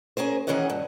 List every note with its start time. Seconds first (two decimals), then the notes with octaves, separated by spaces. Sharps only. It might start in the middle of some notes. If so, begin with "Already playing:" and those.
0.17 C#4 G#4 A#4 C5
0.47 D#3 E3 C#4 G#4 D#5 F#5
0.70 G2